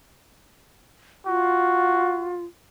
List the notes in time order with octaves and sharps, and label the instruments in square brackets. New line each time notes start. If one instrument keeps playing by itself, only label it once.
[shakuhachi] F4 [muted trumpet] F#4